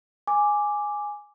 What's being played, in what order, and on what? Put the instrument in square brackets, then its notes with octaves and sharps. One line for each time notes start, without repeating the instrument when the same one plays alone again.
[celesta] G#5 D6